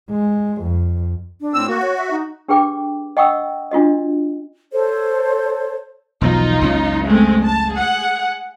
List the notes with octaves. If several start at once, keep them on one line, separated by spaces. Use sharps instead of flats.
G#3
F2
D4
A2 C4 E6
A#3 F#4
C#5
E5
D#4
D4 G4 G#4 B4 G5 D6
D#5 F#5 G5 C#6 D#6 E6
D4 F4 F#4 D#5
A4 C5 C#5
E1 B1 F3 D#4 F4
F#1 C#2 C#4
G#3 A3 C4
A5
G#4 F#5